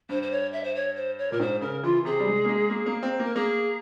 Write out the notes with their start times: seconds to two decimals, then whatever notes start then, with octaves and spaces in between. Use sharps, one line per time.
0.09 G2 C5
0.22 C5
0.31 C#5
0.52 E5
0.63 C5
0.74 C#5
0.96 C5
1.18 C#5
1.31 A#2 A#4
1.40 G#2 C5
1.61 C#3 A#4
1.83 E3 F4
2.05 C3 G#4
2.20 G3
2.27 G#3
2.45 A#3
2.49 G#3
2.70 A#3
2.86 A#3
3.03 C4
3.19 A#3 A#4
3.36 A#3 G#4